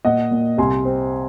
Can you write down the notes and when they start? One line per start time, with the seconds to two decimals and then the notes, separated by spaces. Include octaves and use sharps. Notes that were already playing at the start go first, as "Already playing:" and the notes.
0.05 A#2 D#5 F#5
0.31 A#2
0.58 C2 G#5 C6
0.85 C4